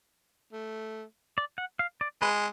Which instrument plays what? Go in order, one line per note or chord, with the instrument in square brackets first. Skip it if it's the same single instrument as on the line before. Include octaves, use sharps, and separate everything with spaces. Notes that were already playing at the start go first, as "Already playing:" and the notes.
[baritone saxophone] A3
[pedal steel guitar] D5
F#5
F5
D5
[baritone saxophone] G#3 [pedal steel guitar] B4